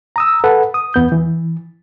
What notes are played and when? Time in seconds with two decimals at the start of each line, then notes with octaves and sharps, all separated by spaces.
0.16 A#5 D#6 E6
0.44 A4 B4 F#5
0.74 D#6
0.94 E2 B3 G6
1.12 E3